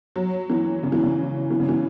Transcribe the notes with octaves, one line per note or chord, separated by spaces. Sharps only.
F#3
E3
C#3
E3
C#3
E3
C#3
E3